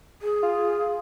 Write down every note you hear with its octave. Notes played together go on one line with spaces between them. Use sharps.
G#4
F4